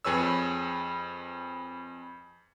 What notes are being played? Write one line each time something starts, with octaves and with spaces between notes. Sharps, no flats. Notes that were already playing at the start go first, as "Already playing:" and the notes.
F2 G#4 B4 C#5 E6